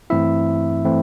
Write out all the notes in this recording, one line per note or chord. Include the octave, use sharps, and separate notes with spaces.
G2 E3 A3 C4 E4 E5
E3 A3 C4 E4